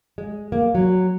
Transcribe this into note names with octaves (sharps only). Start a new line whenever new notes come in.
G#3
A#3
F#3